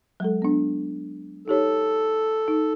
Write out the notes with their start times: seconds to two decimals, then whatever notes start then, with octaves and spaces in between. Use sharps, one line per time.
0.20 F#3 G#3 A4
0.42 B3 D4
1.48 D#4 G4 A4 C#5
2.48 D#4